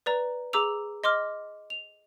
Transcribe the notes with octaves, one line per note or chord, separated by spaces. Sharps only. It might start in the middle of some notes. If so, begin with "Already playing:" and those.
B4 D5 A#5
G#4 A#5 D6 E6 F7
D#5 C6 D6 F6
F7